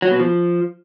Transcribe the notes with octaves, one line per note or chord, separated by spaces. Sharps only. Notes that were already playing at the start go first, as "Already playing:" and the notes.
F#3
B2
F3